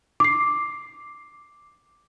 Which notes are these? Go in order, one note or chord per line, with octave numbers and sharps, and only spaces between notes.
D6 C7